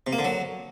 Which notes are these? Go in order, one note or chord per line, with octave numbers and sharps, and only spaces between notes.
C3
A#3
D3
F#3